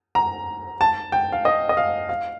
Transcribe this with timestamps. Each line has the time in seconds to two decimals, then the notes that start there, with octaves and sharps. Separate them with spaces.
0.15 A#5
0.81 A5
1.12 G5
1.32 F5
1.45 D#5
1.69 D#5
1.77 F5
2.09 F5